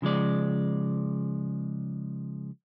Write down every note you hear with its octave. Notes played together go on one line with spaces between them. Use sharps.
C#3 F3 G#3 D5